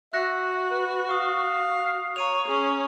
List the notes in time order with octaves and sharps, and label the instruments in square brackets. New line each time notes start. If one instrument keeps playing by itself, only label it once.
[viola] F#4 [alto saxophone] E5 [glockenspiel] F#6 A#6 C#7
[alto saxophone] B4
[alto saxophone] F5 [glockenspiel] C#6 D#6
[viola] C#5 [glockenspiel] A#5 D#7 F7
[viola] C#4 [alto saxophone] G#4